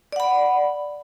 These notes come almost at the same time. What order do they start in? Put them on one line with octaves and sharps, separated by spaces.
D5 F#5 B5